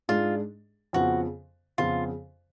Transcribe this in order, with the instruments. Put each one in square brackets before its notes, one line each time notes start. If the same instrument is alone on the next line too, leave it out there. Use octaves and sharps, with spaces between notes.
[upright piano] G#2 G#3 D4 G#4 [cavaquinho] F4
[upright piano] F2 C#3 F3 B3 [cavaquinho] F#4
[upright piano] F2 C#3 F3 B3 [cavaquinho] F4